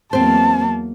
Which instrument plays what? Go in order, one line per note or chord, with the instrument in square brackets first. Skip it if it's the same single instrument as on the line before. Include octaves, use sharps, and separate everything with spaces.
[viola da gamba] E2 F#3 A#3 [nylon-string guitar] C4 C5 [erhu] A5